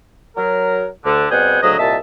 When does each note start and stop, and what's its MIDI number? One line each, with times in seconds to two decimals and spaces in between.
0.37 0.87 54
0.37 0.87 70
1.05 1.25 38
1.05 1.25 50
1.31 1.60 47
1.31 1.60 55
1.31 1.60 60
1.31 1.60 68
1.31 1.60 78
1.31 1.60 79
1.62 1.78 38
1.62 1.78 44
1.62 1.78 49
1.62 1.78 54
1.62 1.78 75
1.79 1.96 36
1.79 1.96 46
1.79 1.96 75
1.79 1.96 76
1.79 1.96 81